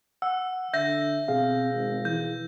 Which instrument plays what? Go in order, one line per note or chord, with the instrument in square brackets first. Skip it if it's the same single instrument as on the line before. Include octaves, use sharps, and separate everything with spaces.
[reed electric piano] F#5 [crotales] E6
[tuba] D3 [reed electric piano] E5 [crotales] G6 A#6
[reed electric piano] B2 G#4 F5 [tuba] C4
[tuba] G#1
[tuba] E3 [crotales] G6